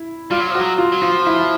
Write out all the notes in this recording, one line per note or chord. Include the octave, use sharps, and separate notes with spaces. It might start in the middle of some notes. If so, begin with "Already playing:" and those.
Already playing: E4
G3 F4
F#3
F3
F#4
F#3
F4
F#3
F3 F4
E4